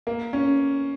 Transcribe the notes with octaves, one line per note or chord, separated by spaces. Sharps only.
A#3
C#4